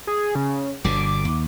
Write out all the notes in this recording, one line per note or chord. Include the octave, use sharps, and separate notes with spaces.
G#4
C#3
G1 B2 D3 D6
D#2